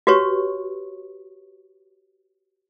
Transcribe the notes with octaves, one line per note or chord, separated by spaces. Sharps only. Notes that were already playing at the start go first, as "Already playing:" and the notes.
F#4 G4 B4 C#5 C#6